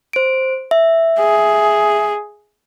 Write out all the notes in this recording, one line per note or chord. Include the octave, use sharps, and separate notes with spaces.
C5 D7
E5
G#4